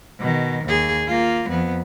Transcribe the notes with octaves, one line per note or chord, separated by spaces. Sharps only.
B2 D#3
D#2 G#4
A#3 F4
F2 B3